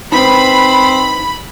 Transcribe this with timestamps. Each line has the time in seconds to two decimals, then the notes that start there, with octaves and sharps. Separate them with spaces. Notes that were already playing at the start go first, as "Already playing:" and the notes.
0.12 C4 D#4 B4 C5 B5